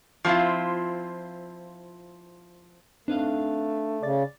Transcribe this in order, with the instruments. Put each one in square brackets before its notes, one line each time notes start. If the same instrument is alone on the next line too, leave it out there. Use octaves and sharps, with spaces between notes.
[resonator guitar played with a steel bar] F3 F#3 C4 E4 F4
[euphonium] A3 [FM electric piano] C4 D#4 [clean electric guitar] D4 B4 F5
[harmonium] C#3 [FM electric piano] D5 A6